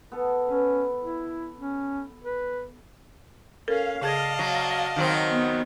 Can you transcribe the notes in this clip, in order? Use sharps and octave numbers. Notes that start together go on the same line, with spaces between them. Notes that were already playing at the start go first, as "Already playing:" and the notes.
B3 A4
C#4 B4
E4
C#4
B4
C#4 A4 A#4 F5
C#3 G#4 D5 D#5 A5 G#6
F#3
D#3 F#3 C4
B3